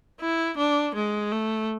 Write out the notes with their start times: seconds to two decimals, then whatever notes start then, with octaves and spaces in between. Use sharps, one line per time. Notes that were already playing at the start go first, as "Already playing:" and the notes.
0.21 E4
0.57 D4
0.95 G#3
1.32 A3